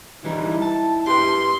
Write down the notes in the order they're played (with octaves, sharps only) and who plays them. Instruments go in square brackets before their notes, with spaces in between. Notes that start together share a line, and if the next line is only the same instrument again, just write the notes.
[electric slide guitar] E3 G3 D#4 [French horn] E4
[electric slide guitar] A5
[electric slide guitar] G4 B4 [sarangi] C6